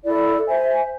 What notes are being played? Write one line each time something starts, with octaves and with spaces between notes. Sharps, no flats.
E4 A4 D5
C5 E5 G#5